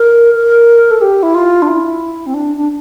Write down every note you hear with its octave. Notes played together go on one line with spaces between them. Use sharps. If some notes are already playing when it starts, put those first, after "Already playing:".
Already playing: A#4
A#4
A4
G4
E4
F4
D4
E4
C4
D4
D4